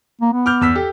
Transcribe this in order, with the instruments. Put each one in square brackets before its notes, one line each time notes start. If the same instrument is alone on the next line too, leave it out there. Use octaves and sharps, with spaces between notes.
[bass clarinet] A#3
B3
[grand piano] D6 F6 G6
E2 E6 B6
G4 A4